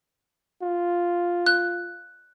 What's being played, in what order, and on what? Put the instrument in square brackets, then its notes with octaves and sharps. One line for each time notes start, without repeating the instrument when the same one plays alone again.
[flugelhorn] F4
[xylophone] F#6